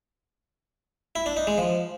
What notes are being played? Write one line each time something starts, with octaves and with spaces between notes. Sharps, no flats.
E4
D4
D#4
G#3
F3